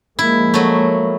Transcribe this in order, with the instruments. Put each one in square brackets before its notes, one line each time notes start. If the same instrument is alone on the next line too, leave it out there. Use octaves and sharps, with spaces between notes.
[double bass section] F3 G#3 A#3 [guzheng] E4
[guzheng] F#3 A3